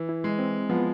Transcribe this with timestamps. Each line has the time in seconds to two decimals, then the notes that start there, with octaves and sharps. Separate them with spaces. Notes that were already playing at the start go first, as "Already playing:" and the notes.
Already playing: E3
0.09 E4
0.24 G#3
0.39 C4
0.69 F3 B3